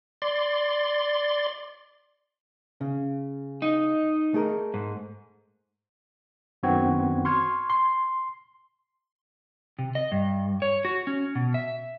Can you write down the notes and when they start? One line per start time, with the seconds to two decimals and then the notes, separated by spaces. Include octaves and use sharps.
0.22 D5 C6
2.81 C#3
3.62 D#4
4.34 A3 G#4 A#4
4.74 G#2
6.63 F#2 D#3 B3 C4 F#4 G#6
7.25 C6 C#6 F6 G#6
7.70 C6
9.79 C3
9.95 D#5
10.12 G2
10.62 C#5
10.85 F#4
11.07 C#4
11.35 B2
11.54 E5